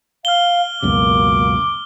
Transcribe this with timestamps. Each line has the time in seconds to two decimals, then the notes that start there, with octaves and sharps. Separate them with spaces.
0.25 F5 F6 G7
0.82 C#2 F#2 B2 A#3 D6